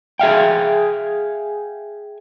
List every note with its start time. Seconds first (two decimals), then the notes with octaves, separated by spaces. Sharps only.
0.19 G#4 E5 F5 G5